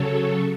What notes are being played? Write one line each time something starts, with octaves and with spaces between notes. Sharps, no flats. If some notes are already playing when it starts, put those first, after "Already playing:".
Already playing: C#3 F#3 A4 C#5